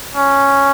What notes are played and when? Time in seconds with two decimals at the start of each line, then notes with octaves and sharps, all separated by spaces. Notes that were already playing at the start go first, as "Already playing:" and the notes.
0.15 C#4